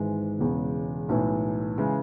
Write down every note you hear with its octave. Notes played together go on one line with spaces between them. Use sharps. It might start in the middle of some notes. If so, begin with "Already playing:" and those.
Already playing: G#1 G#2 E3 G#3
E1 E2 C#3
B1 A2 E3
C#3 E3 G#3